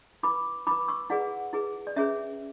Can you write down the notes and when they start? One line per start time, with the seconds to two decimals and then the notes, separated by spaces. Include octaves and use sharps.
0.23 E4 B4 B5 D6
0.67 E4 B4 B5 D6
0.88 C#6 E6
1.10 E4 G#4 B4 D5 F#5
1.53 E4 G#4 B4
1.87 D5
1.96 C#4 G#4 B4 C#5 E5